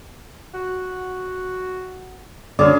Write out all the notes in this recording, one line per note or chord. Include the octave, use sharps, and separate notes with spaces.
F#4
D3 F#3 C#4 G#4 D5